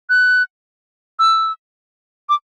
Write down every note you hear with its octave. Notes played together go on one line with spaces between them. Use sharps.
F#6
E6
D6